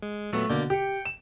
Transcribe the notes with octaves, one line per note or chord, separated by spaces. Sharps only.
G#3
A#2 F#3 A3 B3
B2 D3 A#3 D5 G6
G4 G5 C#7
E7